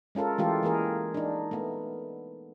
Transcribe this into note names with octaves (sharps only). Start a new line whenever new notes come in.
G#3 C#4 F4 A4 A#4
E3 G#3 A3 F4 G4 A4
E3 A#3 G#4 A#4
D4 D#4
A3 B3